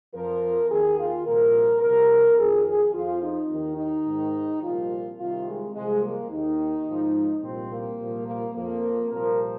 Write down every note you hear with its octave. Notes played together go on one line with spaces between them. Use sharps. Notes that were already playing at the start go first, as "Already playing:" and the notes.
F2 F3 A#4
D#2 D#3 G#4
F4
C2 A#2 F3 A#4
C2 C3 F3 A#4
F2 D#3 G#4
G#4
F2 F3 F4
D#4
D#2 D#3
D#4
G#2 D#3
C2 A#2 F3 F4
C2 C3 D#3 F4
G#3
C2 C3 F3 G#3
A#3
D#2 D#3 D#4
G#2 F3
C2 A#2 F3 C4
A#3
C2 A#2 F3
A#3
F2 F3 A#3
C2 A#2 F3 A#4